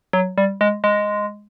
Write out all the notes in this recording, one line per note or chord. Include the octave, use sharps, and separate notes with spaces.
F#3
G3
G#3
G#3